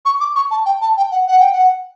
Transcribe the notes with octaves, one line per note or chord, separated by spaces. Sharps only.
C#6
D6
C#6
A5
G5
A5
G5
F#5
F#5
G5
F#5